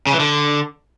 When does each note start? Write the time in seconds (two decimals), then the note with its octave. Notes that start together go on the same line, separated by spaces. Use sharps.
0.07 C#3
0.13 E3
0.20 D3